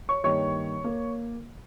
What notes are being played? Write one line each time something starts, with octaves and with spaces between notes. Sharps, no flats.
C#5 C#6
G2 D#3 A#3 C#5 C#6
A#3